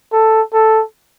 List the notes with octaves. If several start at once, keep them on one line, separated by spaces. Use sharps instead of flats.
A4
A4